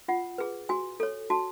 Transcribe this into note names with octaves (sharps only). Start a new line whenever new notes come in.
F4 F#5
G#4 B4
F#4 G#5
A4 C#5
F#4 A5